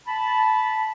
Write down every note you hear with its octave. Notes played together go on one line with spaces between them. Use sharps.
A5 B5